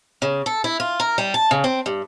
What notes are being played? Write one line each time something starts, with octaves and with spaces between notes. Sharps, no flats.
C#3
A4
E4
F4
A#4
G3
A5
C#3
C4
G2